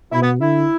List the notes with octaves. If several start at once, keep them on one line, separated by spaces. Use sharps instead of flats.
B2 E4
B3
D3 E4